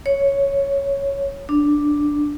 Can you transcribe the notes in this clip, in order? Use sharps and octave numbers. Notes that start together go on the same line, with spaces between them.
C#5
D4